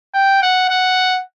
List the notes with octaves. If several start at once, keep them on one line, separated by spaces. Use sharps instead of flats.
G5
F#5
F#5